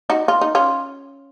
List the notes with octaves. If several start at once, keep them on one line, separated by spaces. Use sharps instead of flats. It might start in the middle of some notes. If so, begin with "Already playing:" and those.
D#4 F#4
F4
D#4
C#4 F4